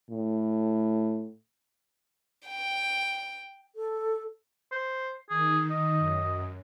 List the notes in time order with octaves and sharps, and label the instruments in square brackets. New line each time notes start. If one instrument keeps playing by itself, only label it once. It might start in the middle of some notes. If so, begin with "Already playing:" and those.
[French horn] A2
[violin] G5
[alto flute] A4
[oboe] C5
[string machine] D#3 [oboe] G#4
[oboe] D#5
[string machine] F#2